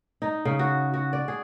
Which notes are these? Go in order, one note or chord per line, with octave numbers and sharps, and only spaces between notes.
D#4
C#3
F#4
F#4
D5
G#4